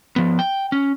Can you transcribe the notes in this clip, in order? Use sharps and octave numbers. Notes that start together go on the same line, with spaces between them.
F3 B3
G5
C#4